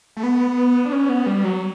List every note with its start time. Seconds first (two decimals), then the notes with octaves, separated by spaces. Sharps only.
0.17 A3
0.23 B3
0.85 D4
0.92 C#4
1.09 B3
1.27 G3
1.44 F#3